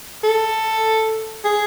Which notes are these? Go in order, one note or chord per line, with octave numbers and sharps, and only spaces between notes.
A4
G#4